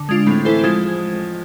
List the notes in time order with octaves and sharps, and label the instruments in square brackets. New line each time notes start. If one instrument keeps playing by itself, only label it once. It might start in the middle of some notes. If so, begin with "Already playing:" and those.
Already playing: [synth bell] D3
G#3 D4 F4
[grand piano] A2 [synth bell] C4
[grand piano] E3 [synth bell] E4 A4 C5
[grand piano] F3 [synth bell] G#3